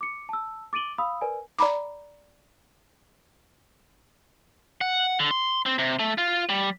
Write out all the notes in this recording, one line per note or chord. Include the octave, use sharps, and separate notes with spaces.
D6 C#7
A5 E6
D6 A6 D7 D#7 F#7 G7
F5 B5 D#6 E6
A#4 B4 D5 G#5
D5 A#5 B5 D6
F#5
D3
C6
C4
C3
A3
F4
G3